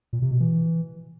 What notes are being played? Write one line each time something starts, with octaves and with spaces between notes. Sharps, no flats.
A#2
C3
B2
E3